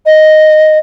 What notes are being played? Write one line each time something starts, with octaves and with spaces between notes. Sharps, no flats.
D#5